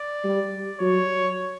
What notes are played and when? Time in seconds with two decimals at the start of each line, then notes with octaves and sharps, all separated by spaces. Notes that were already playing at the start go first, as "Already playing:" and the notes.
Already playing: D5
0.24 G3
0.79 F#3 C#5